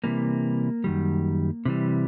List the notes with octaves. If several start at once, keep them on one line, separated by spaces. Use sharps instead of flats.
C3 E3 G3 A#3
F#2 D#3 G3
C3 E3 G3